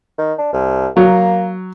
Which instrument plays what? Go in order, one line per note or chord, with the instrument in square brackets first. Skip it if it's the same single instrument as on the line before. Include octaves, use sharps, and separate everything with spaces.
[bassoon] D#3
D4
C2
[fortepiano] F#3 [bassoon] A#3